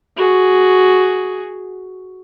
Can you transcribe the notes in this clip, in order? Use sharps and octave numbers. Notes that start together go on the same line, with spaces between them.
F#4 G#4